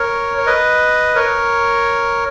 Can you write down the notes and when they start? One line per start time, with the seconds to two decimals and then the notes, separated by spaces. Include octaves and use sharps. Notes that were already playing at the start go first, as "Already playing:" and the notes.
Already playing: A#4 C#5
0.38 C#5
0.46 B4 D#5
1.15 A#4 C#5